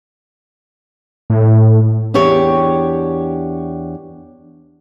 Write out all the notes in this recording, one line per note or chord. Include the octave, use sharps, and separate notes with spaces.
A2
E2 D4 G4 C#5